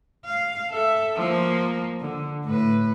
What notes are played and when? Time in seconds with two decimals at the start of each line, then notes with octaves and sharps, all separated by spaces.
0.25 F5
0.70 A4 E5
1.17 F3 A#3
2.01 D3
2.45 A2 B4